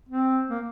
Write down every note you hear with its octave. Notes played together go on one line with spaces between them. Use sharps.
C4
A#3